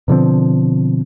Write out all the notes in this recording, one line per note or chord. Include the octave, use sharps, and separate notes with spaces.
B2 D3 F3 C4